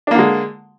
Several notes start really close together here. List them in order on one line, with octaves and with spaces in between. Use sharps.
D4 A#3 D3 G#3